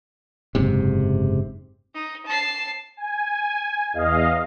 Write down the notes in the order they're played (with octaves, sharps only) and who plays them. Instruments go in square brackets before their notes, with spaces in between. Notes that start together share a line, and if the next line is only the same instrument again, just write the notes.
[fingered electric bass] F#1 G#2 C3
[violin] D#4
A5 C7
[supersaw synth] G#5
E2 D#5 F5